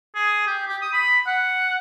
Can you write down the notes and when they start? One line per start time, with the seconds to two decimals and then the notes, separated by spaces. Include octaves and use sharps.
0.15 G#4
0.47 G4
0.68 G4
0.82 D#6
0.93 B5
1.27 F#5